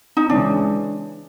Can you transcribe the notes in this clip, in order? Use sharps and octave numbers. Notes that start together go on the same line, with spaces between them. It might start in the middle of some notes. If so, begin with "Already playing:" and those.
D#4
C#3 E3 G#3 C#4 D4